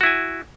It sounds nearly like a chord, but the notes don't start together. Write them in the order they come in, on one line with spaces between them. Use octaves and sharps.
F#4 E4 G#5